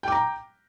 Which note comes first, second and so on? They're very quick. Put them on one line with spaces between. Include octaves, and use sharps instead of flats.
G5 D6 A#5